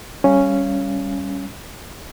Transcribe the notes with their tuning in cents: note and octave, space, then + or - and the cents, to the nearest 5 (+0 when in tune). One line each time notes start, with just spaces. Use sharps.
G3 +10 C#4 +0 F5 -25